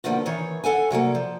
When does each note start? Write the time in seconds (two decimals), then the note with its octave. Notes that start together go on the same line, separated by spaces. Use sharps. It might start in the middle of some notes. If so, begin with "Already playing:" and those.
0.04 B2 D3 D#3 F3 A#3
0.25 D#3 E3 C#5
0.64 G#4 A4 F#5 G#5
0.90 C3 F#3 G3 A#3
1.15 F3